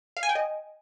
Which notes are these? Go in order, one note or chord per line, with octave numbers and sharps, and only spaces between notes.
F5
G#5
G5
D#5